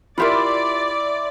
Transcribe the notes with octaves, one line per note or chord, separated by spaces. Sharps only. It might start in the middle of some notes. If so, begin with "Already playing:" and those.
E4 F4 G4 A#4 D5 E5 C6